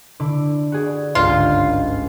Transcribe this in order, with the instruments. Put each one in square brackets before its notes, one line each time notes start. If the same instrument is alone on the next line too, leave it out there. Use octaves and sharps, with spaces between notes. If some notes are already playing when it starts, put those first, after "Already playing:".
[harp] D3 E4 D6
F#4 G#4 D5
[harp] G1 C#2 G#2 [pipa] F4